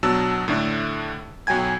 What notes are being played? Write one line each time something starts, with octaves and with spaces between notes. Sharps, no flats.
B2 F#3 D4 A5 E6
A2 D3 A3 D4
B1 F#3 G5 G#5 G#6